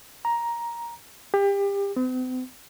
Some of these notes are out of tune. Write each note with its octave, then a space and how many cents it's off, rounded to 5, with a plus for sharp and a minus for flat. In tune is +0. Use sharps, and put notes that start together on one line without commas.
A#5 +10
G4 +30
C4 -45